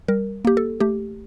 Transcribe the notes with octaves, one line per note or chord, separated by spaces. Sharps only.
G3 A#4
A#3 G4
A4
A3 G4